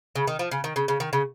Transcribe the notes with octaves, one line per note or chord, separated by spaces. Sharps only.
C#3
D#3
F3
C#3
D#3
C#3
C#3
D#3
C#3